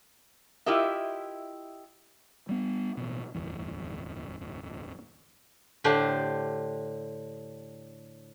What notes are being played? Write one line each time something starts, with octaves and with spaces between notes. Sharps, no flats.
E4 F4 G4 A#4 D#5 E5
G3 B3
A1 B2
D1 G1 E2
A2 D3 A3 D4 G4 C5